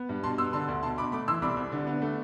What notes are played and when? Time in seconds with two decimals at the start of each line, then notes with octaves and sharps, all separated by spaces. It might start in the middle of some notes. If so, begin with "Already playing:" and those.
Already playing: B3
0.09 G2
0.24 B2 A5 C6
0.38 B3 C6 E6
0.53 D3 A5 C6
0.68 D2
0.83 B2 A5 C6
0.98 B2 B5 D6
1.12 A3 B5 D6
1.28 E3 C6 E6
1.42 C2 B5 D6
1.57 C2
1.72 D3
1.87 B3
2.02 A3